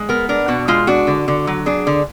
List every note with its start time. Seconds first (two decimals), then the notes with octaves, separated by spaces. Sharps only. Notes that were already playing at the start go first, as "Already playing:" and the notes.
Already playing: G#3
0.09 B3 A#4
0.29 D4 A#4
0.48 B2 F#4
0.68 G#3 F4
0.87 D4 F#4
1.07 D3
1.28 D3
1.47 F#3
1.66 D4 G#4
1.87 D3